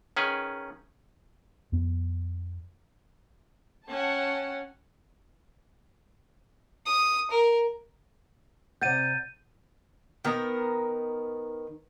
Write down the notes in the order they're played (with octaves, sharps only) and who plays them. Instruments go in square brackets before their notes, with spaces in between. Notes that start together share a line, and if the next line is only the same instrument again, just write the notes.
[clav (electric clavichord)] D#3 C#4 G#4 B4
[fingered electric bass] F2 B3
[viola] C#4 [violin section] F#5 G5 A5
[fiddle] D#6
A#4
[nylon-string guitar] C3 D5 F#5 [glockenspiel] G6 A6 D#7
[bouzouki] D#3 B3 A#4